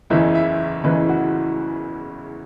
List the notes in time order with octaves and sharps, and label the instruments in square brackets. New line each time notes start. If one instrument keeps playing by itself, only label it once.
[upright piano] F#1 E2 C#3 E3 E5
E5
F#1 E2 C#3 E3 B4
F#4